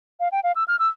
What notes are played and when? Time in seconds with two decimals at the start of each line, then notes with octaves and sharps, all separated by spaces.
0.20 F5
0.32 G5
0.44 F5
0.56 E6
0.68 F6
0.79 E6